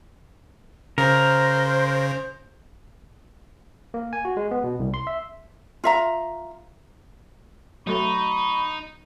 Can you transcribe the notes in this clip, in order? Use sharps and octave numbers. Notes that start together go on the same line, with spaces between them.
C#3 A#4 C5
A#3
G#5
F#4
G#3
B3
B2
C2
C6
E5
F4 E5 A#5
F#3 A3 D#4 B5 C#6